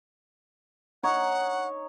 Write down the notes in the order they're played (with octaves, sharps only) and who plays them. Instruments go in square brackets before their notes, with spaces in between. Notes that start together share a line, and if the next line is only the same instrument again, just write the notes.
[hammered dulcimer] D#4 C#5 [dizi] F#5